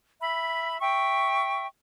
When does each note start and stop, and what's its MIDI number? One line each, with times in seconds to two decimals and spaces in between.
0.21 0.81 76
0.21 0.81 83
0.81 1.66 76
0.81 1.66 79
0.81 1.66 85